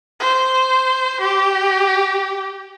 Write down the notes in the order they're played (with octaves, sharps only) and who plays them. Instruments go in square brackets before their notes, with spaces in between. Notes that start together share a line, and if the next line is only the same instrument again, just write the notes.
[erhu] C5
G4